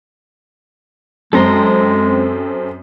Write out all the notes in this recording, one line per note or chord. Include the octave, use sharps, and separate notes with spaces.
F#2 G#3 C4 A4 A#5 C6